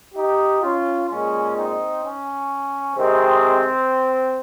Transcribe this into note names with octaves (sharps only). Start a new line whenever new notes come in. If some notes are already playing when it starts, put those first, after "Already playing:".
D#4 G4
C#4 F4
A#2 G#3 C#4
C4 D#4
C#4
C3 D#3 G#3 C4